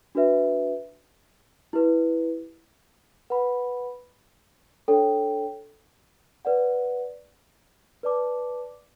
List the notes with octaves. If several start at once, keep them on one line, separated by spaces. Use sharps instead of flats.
D4 F#4 B4 E5
E4 G4 B4
B4 F#5 B5
D4 A4 C#5 G5
B4 D5 F#5
B4 D5 A5 D6